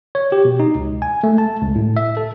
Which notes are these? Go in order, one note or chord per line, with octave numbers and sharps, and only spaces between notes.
C#5
G4
B2
D#4
C#2
G#5
A3
A5
C#2
A2
E5
A4